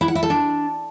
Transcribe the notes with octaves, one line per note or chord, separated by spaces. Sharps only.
E4
F#5
E4
A4
D4